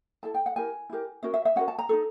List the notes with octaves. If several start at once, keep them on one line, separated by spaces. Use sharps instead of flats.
E4 A4 A5
G5
F#5
E4 G4 A#4 G#5
E4 G4 A#4
C#4 F#4 A#4 E5
E5
E5
C#4 F#4 A#4 F#5
A5
A#5
D#4 F#4 A4